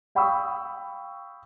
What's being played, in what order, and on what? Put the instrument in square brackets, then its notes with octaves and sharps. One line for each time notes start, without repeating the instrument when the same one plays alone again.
[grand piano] F5 G5 B5 C#6 D#6 E6